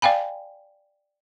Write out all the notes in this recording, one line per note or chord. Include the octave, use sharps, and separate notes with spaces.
D5 F5 G5 G#5 B5